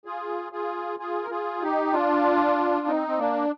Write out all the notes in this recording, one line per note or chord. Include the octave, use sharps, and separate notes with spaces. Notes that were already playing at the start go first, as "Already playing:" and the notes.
F4 G#4
F4 G#4
F4 G#4
A#4
F4 G#4
D#4 G4
D4 F4
C4 D#4
C4
A#3 D4